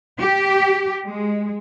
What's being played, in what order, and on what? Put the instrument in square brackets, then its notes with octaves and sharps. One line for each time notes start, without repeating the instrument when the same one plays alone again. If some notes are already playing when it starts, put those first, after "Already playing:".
[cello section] G4
G#3